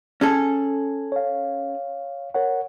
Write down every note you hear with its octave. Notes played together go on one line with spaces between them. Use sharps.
C#4 G#4 A4
C#5 F5
A#4 C#5 F#5